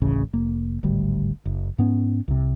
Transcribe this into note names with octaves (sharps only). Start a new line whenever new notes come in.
D1 A1 C#3
F1 A#3
D1 G#1 D2 G3
F#1
G#2 B3 C#4
C2 C3